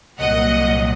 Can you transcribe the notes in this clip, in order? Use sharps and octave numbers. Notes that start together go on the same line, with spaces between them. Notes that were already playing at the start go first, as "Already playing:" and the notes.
C2 A#2 F#3 D#5 F#5